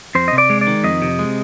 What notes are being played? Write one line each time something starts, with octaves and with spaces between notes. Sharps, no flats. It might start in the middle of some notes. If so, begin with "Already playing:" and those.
F2 C5
D#5
C3
D5
G#3
D5
D#3
F2 D#5
C3
G#3